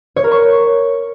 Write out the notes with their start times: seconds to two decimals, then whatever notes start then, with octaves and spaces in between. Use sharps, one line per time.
0.16 C#5
0.24 A#4
0.32 C#6